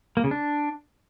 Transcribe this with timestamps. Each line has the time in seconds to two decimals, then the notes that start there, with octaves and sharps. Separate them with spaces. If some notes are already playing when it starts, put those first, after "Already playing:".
0.17 A#3
0.24 C#3
0.31 D4